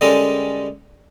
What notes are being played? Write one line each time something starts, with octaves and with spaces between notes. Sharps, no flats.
D3 G3 G#3 C#4 A4 A#4